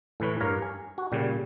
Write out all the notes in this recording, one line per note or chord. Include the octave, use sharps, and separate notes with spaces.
A2 E3 B4 C#5
G2 A#4 C#5 F5
G#5
F#4
A#2 C#3 G3